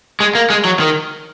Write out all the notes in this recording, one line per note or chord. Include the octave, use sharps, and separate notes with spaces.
G#3
A#3
G#3
F#3
D#3